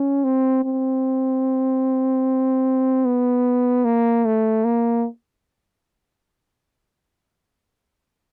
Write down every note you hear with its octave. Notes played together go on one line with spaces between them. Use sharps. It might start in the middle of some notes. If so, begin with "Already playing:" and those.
Already playing: C#4
C4
C4
B3
A#3
A3
A#3